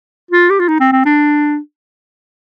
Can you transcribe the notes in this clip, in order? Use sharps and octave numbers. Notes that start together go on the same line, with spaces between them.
F4
G4
F4
D#4
C4
C4
D4